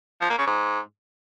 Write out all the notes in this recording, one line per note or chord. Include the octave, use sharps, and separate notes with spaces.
F3
A#3
C#3
G#2